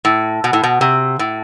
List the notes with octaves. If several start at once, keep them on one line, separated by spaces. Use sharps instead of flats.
A2
B2
A2
B2
C3
A2